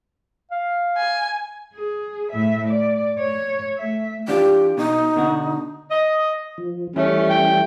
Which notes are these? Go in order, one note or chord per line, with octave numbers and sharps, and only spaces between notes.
F5
G#5
G#4
A2 E5
D5
C#5
A3 E5
E3 D4 F4 G4
B2 D#4
B2 D3 F#4
D#5
F3
E3 G3 A3 C#4
G5